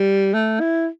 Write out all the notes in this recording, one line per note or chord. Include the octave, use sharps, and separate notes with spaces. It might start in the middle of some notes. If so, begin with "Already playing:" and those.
Already playing: G3
A3
E4